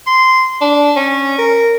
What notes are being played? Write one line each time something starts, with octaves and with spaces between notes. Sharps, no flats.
C6
D4
C#4
A#4